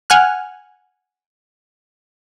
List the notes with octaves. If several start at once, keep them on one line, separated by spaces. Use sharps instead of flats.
F#5 G#5 F6 F#6